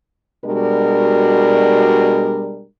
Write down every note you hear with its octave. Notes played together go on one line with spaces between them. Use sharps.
B2 G3 G#3 D4 F#4 A#4